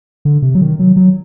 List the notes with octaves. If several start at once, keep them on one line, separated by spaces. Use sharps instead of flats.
D3
C3
F#3
D#3
F#3
F#3